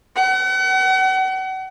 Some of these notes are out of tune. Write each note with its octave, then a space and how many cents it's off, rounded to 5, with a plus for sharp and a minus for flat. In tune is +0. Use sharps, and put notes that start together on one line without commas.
F#5 +40